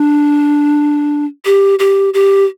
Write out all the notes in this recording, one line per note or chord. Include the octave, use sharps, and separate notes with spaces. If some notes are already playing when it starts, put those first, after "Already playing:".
Already playing: D4
G4
G4
G4